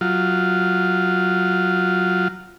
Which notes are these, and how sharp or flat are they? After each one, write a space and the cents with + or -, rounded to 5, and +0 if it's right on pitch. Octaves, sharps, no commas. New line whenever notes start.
F#3 +0 F4 +0